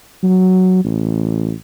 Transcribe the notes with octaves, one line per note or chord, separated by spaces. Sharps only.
F#3
A1